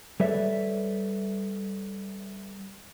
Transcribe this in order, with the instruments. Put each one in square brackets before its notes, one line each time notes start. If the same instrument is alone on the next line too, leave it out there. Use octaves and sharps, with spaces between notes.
[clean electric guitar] G3 A4 B4 C#5 D5 E5